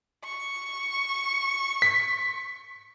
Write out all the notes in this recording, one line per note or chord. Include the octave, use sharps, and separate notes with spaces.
C#6
B6